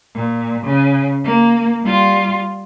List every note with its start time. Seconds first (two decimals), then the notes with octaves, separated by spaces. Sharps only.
0.15 A#2
0.65 C#3
1.25 A#3
1.83 G3 F4